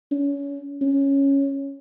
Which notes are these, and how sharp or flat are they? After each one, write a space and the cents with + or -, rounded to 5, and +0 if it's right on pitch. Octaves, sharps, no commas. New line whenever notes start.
C#4 +25
C#4 +0